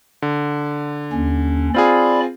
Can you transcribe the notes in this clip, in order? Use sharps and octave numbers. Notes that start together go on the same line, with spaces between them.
D3
D#2 C#4
C4 F4 G#4 D5 B5